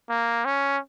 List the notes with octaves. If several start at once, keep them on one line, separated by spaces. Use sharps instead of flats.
A#3
C#4